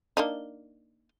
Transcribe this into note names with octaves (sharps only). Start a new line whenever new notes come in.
A#3 D4 D#4